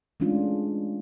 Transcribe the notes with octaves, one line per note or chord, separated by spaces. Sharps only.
E3 G#3 A3 C#4 D4 F4